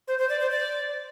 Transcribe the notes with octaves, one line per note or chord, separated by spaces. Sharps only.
C5
C5
D5
C5
D5